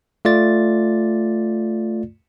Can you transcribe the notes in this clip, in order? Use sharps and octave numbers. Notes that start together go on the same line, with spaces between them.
A3 F4 D5 A6